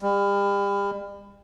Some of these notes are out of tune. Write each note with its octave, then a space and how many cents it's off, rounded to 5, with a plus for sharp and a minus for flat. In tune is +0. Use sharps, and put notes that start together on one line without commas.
G3 +35